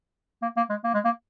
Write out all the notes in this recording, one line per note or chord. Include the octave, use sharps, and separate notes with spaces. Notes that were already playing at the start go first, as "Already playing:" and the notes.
A#3
A#3
G#3
A#3
G#3
A#3